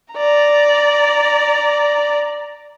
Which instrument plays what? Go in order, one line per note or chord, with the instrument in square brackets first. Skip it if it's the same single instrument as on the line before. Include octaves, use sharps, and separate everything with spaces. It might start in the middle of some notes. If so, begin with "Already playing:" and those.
[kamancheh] D5 A#5